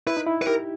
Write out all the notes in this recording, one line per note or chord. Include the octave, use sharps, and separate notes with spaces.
E4 B4
D#4
E4
B4
G4 A#4